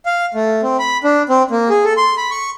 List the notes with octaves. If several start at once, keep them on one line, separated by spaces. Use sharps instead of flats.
F5
A3
C4
B5
D4
C4
A#3
G#4
A4
C6
B5
C#6